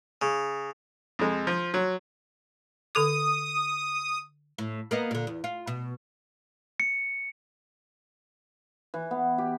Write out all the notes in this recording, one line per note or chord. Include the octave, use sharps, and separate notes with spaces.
C#3
F2 G#3
F3
F#3
D3 A4 D6 D#6
A2
A#3 B3 D#5
A#2 D3
E2
F4
B2
C#7
E3
B3
G4